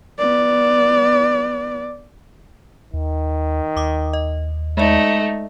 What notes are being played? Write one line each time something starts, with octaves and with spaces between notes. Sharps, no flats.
B3 D5
D#2 D#3
D#2 D6 D#6
D#5
G#3 A3 D#4 D5